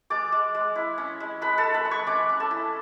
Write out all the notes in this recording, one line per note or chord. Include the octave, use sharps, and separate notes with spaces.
G#3 D5 D6
G#3
G#3
E4
C#4
G#3
G#3 B4 B5
A4 A5
G#3
B4 B5
G#3
C#5 C#6
C#4 D5 D6
C#4
A4 A5
E4